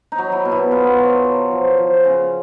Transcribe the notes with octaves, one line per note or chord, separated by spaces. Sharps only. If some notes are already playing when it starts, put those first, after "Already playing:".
D#4
F#3
E4
B2
E4
B2 F4
F#3
F#3
F3
F3
C#3